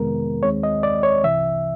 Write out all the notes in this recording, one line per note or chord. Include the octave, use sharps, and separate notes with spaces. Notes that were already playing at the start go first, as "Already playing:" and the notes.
Already playing: F2 C3 D#3 G#3 B3 A#4
D#2 D#3 G#3 C4 C#5
D#5
D5
C#5
C2 C3 E3 E5